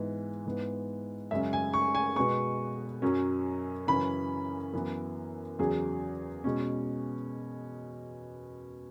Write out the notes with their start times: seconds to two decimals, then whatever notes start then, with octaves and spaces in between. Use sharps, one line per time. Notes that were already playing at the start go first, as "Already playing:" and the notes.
Already playing: G#2 E3 B3
0.46 G#2 E3 B3
1.31 F#2 C#3 G#3 C#4 E5
1.53 G#5
1.74 C#6
1.95 G#5
2.16 B2 G#3 B3 C#6
3.02 F#2 F#3 C#4
3.87 F#2 C#3 E3 C#4 B5
4.73 F#2 E3 B3
5.59 E2 C#3 F#3 G#4
6.44 B2 G#3 C#4